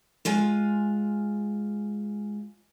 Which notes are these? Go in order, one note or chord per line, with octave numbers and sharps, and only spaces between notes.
G#3 F4 G#5